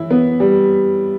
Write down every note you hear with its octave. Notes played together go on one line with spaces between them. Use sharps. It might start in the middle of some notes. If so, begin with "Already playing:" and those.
Already playing: E3 E4
B3
G3